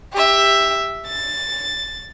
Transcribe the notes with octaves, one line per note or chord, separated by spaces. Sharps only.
G4 E5
A6